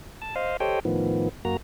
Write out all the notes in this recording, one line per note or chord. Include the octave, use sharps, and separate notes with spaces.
A5
C5 D#5 F5
G4 A4 C5 C#5 D#5 G5
A2 D#3 F3 B3
F#2 A#3 F#4 A#5